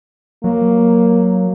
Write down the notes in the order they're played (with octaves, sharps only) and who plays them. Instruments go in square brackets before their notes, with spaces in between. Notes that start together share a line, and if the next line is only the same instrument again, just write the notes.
[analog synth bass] F#3 [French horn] A#3